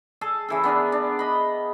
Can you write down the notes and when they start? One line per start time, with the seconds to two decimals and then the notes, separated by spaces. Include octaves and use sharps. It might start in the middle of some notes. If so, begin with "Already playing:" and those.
0.21 G#4 A4 A5
0.49 C#3 E3 A4
0.64 B3 D4 G#4 A#4
0.92 D4
1.19 D#5 B5